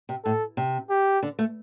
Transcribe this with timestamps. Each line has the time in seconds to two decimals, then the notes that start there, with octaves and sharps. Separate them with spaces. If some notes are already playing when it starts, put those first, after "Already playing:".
0.09 C3
0.25 A2 A4
0.57 C3
0.90 G4
1.23 D3
1.39 A3